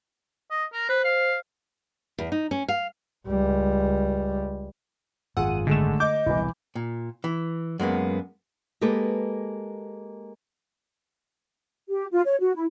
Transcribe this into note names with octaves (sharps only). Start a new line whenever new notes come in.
D#5
A#4
B4 C5
F5
E2
D#4
C#4
F5
C#2 G3
G#1 F#2 F4 G#4 F#5 E6 D#7
D3 G#3 A3 E7
D#5 D6 G6
E1 C2 A#2 E3 E4
A#2
E3
F#2 G#3 A#3 B3
G#3 A#3 G4 A4 B4
G4
F4
C#5
F#4
E4